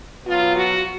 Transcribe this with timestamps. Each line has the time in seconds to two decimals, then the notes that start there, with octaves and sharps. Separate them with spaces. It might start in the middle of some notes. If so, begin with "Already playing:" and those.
0.26 B2 F#3 F4
0.56 F#4